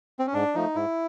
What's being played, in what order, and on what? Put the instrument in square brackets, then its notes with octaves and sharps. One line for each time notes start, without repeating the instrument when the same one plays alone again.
[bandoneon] C4
C#4
G#2 D4
F3 A3 D#4
G#2 E4